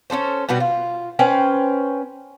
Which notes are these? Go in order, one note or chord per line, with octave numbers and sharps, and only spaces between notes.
C#4 D4 A4 C5
B2 G3 F#4 B4
F4
C#4 B4 C5 G5